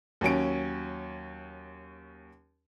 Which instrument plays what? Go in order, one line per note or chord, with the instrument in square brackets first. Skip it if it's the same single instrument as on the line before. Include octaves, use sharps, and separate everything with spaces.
[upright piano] D#2 F#3 C#4 D7